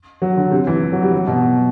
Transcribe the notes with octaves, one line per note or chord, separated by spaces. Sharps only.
F#3
D3
C3
E3
F#3
G3
F#3
B2